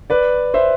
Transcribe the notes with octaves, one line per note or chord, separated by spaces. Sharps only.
B4 D5
C5 E5